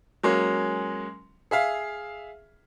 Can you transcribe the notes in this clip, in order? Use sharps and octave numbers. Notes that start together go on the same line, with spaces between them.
F#3 G#3 A#3 C#4
G#4 E5 F5